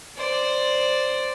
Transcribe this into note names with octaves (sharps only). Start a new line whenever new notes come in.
C5 D5